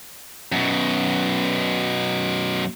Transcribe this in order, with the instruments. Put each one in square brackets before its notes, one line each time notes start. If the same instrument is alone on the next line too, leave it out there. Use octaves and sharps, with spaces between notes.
[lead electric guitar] F#2 B2